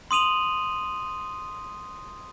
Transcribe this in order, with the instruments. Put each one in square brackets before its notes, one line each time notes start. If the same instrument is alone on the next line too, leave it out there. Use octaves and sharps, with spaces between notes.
[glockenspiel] C6 D#6 D#7 F7 F#7